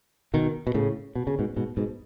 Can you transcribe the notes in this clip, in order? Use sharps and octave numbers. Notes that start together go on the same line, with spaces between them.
B2 D#3
B2
A2 C#3
B2
C#3
G#2 B2
G#2 B2
G#2 B2